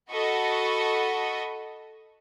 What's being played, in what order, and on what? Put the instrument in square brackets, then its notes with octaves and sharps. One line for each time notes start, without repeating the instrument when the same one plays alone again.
[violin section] F#4 A4 D#5 B5 C#6